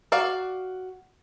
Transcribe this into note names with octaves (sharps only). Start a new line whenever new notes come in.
F#4 D5 F5